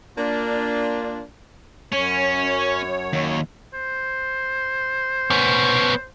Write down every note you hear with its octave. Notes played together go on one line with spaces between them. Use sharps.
A#3 D4 F4
F#2 C#4 C#5
D#2
C5
B3 C#4